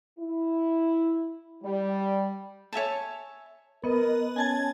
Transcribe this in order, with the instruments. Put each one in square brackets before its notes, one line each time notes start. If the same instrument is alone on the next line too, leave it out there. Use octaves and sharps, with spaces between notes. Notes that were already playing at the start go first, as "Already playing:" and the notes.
[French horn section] E4
G3
[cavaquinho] C#5 E5 G#5 A5
[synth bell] B3 D#5 [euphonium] A#4
[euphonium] C#4 [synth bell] G#5 A5 G#6